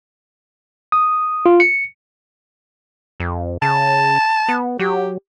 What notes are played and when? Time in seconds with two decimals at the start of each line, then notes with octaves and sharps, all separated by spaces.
0.92 D#6
1.46 F4
1.60 C#7
3.20 F2
3.62 C#3 A5
4.48 B3
4.79 F#3 G4